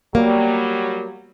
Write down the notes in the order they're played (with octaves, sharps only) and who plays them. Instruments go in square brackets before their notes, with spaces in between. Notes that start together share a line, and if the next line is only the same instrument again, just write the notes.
[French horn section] F#3 G3 [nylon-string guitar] A#3